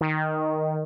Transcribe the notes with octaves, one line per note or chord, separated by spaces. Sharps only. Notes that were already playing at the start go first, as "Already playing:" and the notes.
D#3